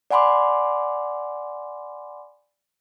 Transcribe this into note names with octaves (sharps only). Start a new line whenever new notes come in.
D5 F#5 G#5 B5 C6 D6